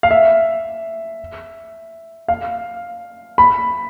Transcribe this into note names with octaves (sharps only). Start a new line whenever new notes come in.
F5
E5
F5
B5